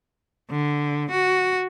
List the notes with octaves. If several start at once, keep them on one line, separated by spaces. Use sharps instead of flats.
D3
F#4